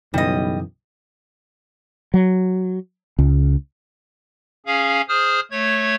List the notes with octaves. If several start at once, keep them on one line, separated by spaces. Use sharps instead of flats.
B1 F#2 C#3 E3 G3 D#5
F#3
C#2
C#4 G#4 F5
G#4 C5 D#6 F6
A3 C#5 G#6